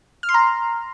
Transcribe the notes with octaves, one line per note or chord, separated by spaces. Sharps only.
F6
C6
A#5